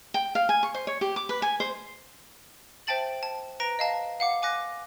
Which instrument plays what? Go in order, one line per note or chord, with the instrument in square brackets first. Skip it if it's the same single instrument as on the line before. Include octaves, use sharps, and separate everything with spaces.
[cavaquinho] G5
F5
G#5
C#6
C5
C#5
G4
D6
B4
G#5
C5
[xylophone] C5 E5 G5 A5 A6 F#7
A5
B4 A#5 A#6 D7
D#5 F5 A5
F5 F#5 D6
G#5 D6 F#6 A#6